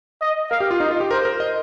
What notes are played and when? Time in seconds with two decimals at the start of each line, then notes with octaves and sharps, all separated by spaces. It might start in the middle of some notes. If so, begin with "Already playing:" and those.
0.21 D#5
0.51 A#4 F5
0.60 G4
0.71 F4
0.80 D#4 D#5
0.91 F4
1.00 G4
1.11 A#4 C5
1.25 A#4
1.40 D#5